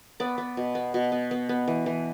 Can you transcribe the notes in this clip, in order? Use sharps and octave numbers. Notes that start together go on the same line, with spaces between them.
B3 D5
B3
B2
B3
B2
B3
B3
B3
E3
E3